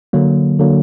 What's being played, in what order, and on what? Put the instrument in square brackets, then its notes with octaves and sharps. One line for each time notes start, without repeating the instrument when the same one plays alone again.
[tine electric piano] D3 F#3 A#3
D3 F#3 A#3